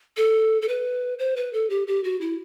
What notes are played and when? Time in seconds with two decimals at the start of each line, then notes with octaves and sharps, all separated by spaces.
0.17 A4
0.62 A4
0.68 B4
1.19 C5
1.36 B4
1.53 A4
1.70 G4
1.87 G4
2.04 F#4
2.21 E4